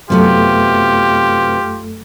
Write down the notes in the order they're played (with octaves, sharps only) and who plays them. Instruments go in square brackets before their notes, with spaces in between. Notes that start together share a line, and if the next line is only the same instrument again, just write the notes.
[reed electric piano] F#2 A3 A4 [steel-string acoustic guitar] C3 F#3 B3 [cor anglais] F4 [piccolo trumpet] G4